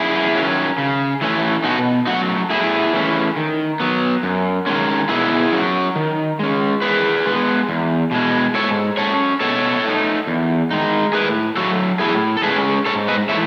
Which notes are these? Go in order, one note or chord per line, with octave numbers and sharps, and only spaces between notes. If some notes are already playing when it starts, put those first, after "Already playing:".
Already playing: F#2 E4 G#4
D#3 F#3 C#4
C#3
E3 A3 C#4
B2 D#4 F#4
F#3 A3 C#4 D#4 F#4
A2 E4 G#4
E3 A3 C#4
D#3
F#3 B3
F#2
D#3 G#3 C#4
B2 E4 G#4
F#3 C#4
D#3
G#3 C#4
D#3 G#4 B4
G#3 B3
E2
B2 G#3
G#2 A4 C#5
F#3 C#4 A4 C#5
B2 A4 C#5
A3 D#4
E2
D#3 G#3 D#4
A2 G#4 B4
F#3 A3 F#4 A4
A2 E4 G#4
A4
G#3 C#4 G#4 B4
G#2 A4 C#5
B4 D#5
E3 A3 C#5 E5